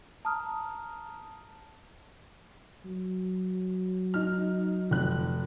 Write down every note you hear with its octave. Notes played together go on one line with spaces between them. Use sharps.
A5 A#5 D#6 F6
F#3
D#4 F6
F1 F#6